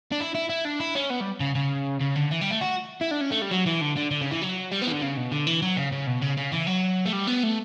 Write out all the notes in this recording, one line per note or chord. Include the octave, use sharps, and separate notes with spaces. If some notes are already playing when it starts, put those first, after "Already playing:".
D4
E4
E4
E4
D4
E4
C#4
B3
G3
C#3
C#3
C#3
D3
E3
G3
A3
F#4
E4
D4
C#4
A3
G3
F#3
E3
D3
D3
D3
C#3
E3
F#3
G3
B3
E3
D3
C#3
B2
D3
E3
F#3
C#3
C#3
B2
C#3
C#3
E3
F#3
A3
G3
B3
A3